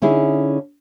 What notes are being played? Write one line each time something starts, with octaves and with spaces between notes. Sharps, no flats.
D3 C#4 D#4 E4 G#4